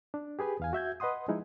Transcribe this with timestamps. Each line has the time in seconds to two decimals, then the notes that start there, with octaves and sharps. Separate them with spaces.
0.14 D4
0.39 G4 G#4 B4 G#5
0.60 E2 F5 G#5
0.73 F#4 E5 G6 G#6
1.00 B4 D#5 F#5 C6 D#6
1.28 F3 G#3 D#4 E4